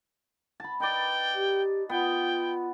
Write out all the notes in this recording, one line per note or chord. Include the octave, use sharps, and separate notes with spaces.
A5 B5
D#4 B4 D5 G5
G4
B3 F4 G5